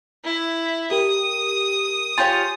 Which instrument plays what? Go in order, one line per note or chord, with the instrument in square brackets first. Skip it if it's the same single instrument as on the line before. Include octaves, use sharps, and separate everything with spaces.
[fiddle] E4
[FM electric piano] G4 A#4 [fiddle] D#6
[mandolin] F4 G4 C#5 [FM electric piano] G#5